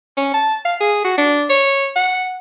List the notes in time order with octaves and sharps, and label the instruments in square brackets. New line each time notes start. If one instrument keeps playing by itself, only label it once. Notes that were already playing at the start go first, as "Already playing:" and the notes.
[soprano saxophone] C#4
A5
F5
G#4
F#4
D4
C#5
F#5